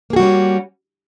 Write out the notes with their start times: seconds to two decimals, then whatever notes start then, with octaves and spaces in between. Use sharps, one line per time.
0.10 A#3
0.13 G#4
0.16 F#4
0.20 G3
0.23 C#4